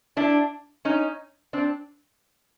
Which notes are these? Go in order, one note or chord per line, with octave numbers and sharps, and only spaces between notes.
D4 E4
C#4 D#4
C4 D4